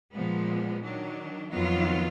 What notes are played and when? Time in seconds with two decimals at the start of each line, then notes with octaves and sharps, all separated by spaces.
0.13 A#2 F3 G#3 B3
0.82 D#3 F#3 D4
1.52 F2 D#3 F#3 B3 F4